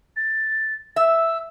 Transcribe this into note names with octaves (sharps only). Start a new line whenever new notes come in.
A6
E5 E6